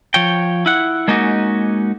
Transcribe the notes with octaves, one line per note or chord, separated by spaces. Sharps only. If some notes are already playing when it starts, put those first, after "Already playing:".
F3 C#5 G5
E4 F#5
G#3 A#3 C#4 D#4 F#4